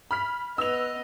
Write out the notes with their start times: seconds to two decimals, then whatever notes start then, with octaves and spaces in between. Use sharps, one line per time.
0.11 B5 F6 B6
0.58 B3 B4 D#5 E6 F7